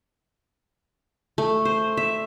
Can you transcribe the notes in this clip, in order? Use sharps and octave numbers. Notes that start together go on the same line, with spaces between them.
A3
C5
E5